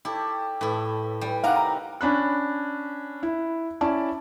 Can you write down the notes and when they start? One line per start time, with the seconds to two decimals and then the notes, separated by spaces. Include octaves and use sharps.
0.05 E4 G4 A4 C#5
0.61 A2 E4 B4 E5
1.21 G3 G#4 B4 G5
1.44 C3 E3 D#4 G4 A#4 F5 F#5
1.56 A#5
2.01 C#4 D4 B5 F#6
3.23 E4
3.81 C#4 E4 D5 A5